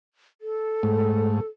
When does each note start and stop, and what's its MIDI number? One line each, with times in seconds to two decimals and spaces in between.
0.41 1.47 69
0.83 1.40 44
0.83 1.40 57